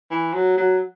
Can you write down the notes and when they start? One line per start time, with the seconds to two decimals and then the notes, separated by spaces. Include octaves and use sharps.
0.11 E3
0.34 F#3
0.57 F#3